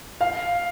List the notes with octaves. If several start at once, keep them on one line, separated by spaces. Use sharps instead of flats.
F5